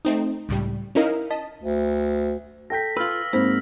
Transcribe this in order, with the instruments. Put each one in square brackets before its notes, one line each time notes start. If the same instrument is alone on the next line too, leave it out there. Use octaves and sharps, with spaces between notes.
[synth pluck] A3 C4 D#4
C#2 A2 G3
C#4 D#4 E4 A#4 D#5 F5
D#5 A5 B6
[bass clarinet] D2
[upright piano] A4 G5 G6 [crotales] A#6 B6
[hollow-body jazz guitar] F4 B4 [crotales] E6 F6 F#7
[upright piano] G#2 [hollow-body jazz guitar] A#3 [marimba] C4 C5